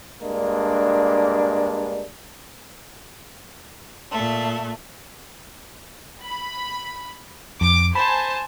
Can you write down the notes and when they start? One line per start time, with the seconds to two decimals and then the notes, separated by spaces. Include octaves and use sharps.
0.23 G2 G#3 A#3 D4
4.11 A#2 A3
6.22 B5
7.61 F2 D6
7.95 C5 G#5 A5 B5